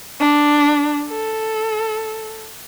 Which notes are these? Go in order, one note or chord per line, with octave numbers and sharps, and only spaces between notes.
D4
A4